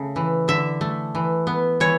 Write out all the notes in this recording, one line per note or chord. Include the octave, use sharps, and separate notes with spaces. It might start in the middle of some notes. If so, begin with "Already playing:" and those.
Already playing: C#3 A3
E3
D3 E5
A3
E3
B3
E3 C#5